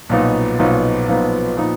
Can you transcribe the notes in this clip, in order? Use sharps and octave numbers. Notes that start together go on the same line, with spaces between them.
B1 A#2 F3 B3 D#4
B1 A#2 F3 B3 D#4
B1 A#2 F3 B3 D#4
A#2 F3 B3 D#4